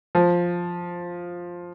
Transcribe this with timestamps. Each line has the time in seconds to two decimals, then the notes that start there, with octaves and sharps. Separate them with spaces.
0.15 F3